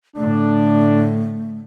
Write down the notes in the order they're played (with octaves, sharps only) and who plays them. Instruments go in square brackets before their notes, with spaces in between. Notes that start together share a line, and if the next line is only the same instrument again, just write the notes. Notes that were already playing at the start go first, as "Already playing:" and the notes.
[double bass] A2 D3 [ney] A3 [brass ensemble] D4